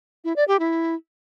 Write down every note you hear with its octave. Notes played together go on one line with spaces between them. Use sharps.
E4
D5
G4
E4